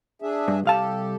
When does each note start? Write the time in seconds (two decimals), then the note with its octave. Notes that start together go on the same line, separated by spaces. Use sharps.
0.22 D4 G#4 E5
0.48 G2
0.65 C2 G4 A4 F5 A5